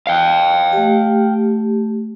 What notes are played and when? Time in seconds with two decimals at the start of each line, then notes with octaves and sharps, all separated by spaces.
0.07 F5 G5
0.73 A3 G4